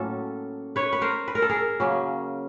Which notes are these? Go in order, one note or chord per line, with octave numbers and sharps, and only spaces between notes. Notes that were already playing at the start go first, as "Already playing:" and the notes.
Already playing: A2 F#3 A#3 C#4 A4
B4 C#5
B4
A#4 C5
B4
A#4
A4
G#4 A#4
C#3 F#3 A#3 C#4